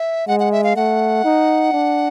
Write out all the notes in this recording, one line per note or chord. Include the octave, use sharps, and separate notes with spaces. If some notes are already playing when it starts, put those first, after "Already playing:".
Already playing: E5
G#3 F#5
F#5
E5
F5
A3 F#5
D#4
D4